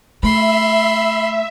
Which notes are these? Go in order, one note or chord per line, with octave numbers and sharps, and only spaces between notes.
A3 E5 B5 C6